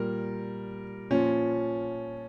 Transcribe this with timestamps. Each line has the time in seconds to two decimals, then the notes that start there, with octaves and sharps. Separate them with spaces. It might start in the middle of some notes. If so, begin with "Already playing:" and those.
Already playing: A#2 G3 A#4
1.10 A#2 F3 C#4